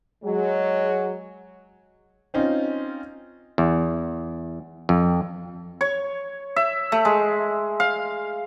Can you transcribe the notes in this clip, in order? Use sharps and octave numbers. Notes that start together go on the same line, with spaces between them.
F#3 G#3
C4 C#4 D#4 F4
E2
F2
C#5
E5
A3
G#3
F5